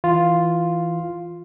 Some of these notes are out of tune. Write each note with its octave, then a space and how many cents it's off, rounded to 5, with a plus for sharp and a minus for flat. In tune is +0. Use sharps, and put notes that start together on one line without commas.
E3 +0 F4 +0